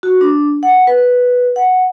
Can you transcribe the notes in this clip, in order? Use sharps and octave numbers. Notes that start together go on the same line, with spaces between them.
F#4
D4
F#5
B4
F#5